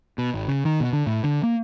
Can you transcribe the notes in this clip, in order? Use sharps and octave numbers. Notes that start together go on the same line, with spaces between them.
B2
G#1
C#3
D#3
B2
D3
A2
D3
A#3